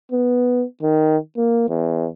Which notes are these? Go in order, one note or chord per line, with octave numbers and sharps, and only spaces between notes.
B3
D#3
A#3
E2